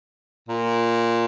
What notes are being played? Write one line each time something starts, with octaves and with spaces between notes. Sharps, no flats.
A#2